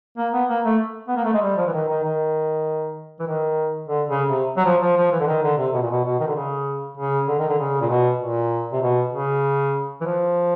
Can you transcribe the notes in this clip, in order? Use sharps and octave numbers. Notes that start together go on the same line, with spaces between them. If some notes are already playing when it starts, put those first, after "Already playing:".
A#3
B3
A#3
A3
B3
A#3
A3
G#3
G3
F3
E3
D#3
D#3
D#3
E3
D#3
D3
C#3
C3
F#3
F3
F3
F3
E3
D3
D#3
D3
C3
B2
A#2
B2
B2
D#3
D3
C#3
C#3
D3
D#3
D3
C#3
A#2
B2
A#2
C3
B2
C#3
E3
F3